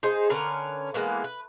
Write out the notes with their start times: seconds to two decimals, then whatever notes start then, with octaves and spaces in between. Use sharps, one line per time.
0.03 D#4 G#4 C5
0.29 D3 C#4 A#4 B4
0.94 E3 G#3 A#3 B3
1.24 B4